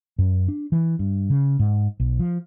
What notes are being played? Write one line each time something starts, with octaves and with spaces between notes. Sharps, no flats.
F#2
D4
E3
G2
C#3
G#2
B1
F3